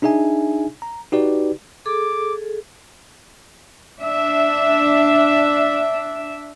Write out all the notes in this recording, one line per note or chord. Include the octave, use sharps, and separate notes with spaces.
D4 D#4 G#4 E5 G#5
A#5
D#4 F#4 G4 B4 D5
G#4 A4 D6
D4 E5